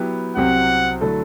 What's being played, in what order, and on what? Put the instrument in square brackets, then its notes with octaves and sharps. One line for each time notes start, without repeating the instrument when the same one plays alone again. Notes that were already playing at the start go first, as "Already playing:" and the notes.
Already playing: [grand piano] F#3 B3 E4 G4
[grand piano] C2 C3 F#3 C4 G4 [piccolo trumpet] F#5
[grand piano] D3 F#3 A3 E4 A4